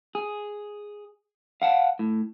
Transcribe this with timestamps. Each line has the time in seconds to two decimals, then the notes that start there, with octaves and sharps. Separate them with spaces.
0.15 G#4
1.62 F5 F#5 A5
1.99 A2